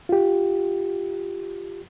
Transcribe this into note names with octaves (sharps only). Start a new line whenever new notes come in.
F4 G4